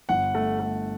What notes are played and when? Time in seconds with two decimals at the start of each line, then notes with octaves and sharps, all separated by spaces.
0.09 G1 F#5
0.35 A3
0.60 A3